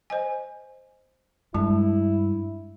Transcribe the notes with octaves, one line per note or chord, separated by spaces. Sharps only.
C5 D#5 G#5
G2 G#3 E4 A5